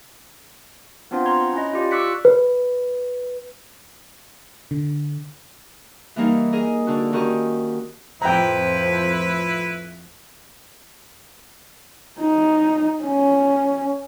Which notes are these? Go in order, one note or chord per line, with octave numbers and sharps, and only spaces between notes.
B3 C4 D4 F4 C5 F#5
A#5 C6 G#6
C#4 E4 D#5
F4 G4 D5
C#6 D6 E6 F#6 B6 C#7
B4
D3
E3 G3 A#3 D#4 A#4
G#4 A#4 D#5
D3 D4 F#4
D#3 C#4 F#4 G4 A#4 D#5
F2 A2 F3 E4 B4 C5 G5 A#5
D#4
C#4